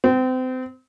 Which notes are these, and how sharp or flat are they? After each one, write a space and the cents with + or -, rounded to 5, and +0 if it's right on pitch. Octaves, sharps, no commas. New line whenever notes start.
C4 -30